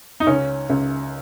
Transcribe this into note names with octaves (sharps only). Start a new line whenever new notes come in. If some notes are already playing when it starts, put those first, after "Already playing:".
D#4
C#2 C#4
C#2